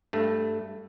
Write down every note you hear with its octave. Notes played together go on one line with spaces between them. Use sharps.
G2 A3